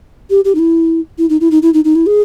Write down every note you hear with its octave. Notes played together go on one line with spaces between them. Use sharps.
G4
G4
D#4
E4
E4
D#4
E4
D#4
E4
D#4
D#4
E4
G#4